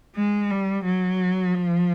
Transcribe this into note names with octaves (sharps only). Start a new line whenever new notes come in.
G#3
G3
F#3
F3